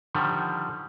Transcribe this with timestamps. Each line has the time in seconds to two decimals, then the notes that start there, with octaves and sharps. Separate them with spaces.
0.15 D3 D#3 F3 G3